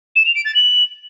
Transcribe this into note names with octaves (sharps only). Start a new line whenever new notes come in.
E7
F7
D7
A6
F#7